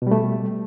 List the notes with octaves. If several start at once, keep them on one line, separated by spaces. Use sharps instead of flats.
B2 G3 A3